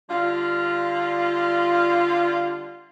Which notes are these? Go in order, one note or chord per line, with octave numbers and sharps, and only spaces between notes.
D3 G3 F4